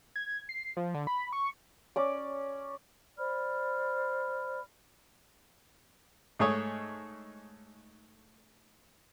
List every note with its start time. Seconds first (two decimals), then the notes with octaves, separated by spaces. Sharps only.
0.16 G#6
0.49 C7
0.77 F3
0.94 D3
1.07 B5
1.33 C#6
1.96 C#4 D5 D6
3.18 C5 D5 B5 F6
6.39 G#2 A3 G#4 C#5 D#6